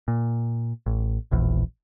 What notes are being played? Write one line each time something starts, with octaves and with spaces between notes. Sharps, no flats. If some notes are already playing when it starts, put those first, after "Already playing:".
A#2
A1
E1 A#1 E2